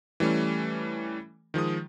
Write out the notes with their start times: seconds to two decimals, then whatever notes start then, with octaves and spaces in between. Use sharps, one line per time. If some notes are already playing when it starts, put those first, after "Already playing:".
0.20 E3 G3 A3 C#4
1.54 D#3 F3 G#3 D#6